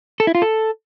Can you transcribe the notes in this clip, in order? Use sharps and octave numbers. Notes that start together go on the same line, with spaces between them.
A4
E4
F4
A4